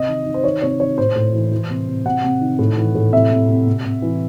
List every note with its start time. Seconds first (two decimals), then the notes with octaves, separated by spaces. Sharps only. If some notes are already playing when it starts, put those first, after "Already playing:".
Already playing: C3 D#5
0.08 D#3
0.26 D#3
0.34 C5
0.44 D#3 C#5
0.62 C3 C#5
0.79 D#3 C#5
0.98 A2 C5
1.16 A2
1.33 E3
1.52 E3
1.70 C3
1.88 C3
2.06 C3 F#5
2.24 C3
2.41 D#3
2.59 A2
2.77 E3
2.95 A2
3.12 C3 E5
3.30 C3
3.48 C3
3.66 C3
3.84 C3
4.02 E3